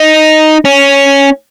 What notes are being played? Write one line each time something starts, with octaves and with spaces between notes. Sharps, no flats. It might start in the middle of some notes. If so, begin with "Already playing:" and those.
Already playing: D#4
C#4